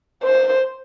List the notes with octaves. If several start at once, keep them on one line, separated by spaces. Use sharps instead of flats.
C5